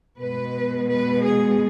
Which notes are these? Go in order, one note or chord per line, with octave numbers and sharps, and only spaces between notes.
B2 G#3 B4
B4
G#4